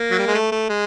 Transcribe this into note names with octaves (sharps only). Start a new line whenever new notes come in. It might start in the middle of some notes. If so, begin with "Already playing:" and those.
Already playing: A#3
F#3
G3
G#3
A3
A3
G#3